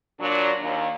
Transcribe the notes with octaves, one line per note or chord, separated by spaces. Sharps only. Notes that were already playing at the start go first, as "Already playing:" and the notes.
A#2 F#3 D4
D#2